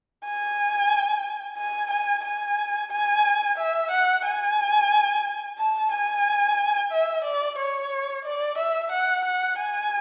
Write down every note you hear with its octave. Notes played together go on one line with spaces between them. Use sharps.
G#5
G#5
G#5
G#5
G#5
E5
F#5
G#5
A5
G#5
E5
D5
C#5
D5
E5
F#5
F#5
G#5